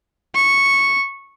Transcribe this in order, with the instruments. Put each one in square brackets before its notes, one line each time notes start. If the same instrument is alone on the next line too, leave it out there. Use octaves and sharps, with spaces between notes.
[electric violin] C#6